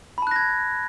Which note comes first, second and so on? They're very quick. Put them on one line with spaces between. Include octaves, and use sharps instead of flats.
B5 A5 F#6 A#6 G#6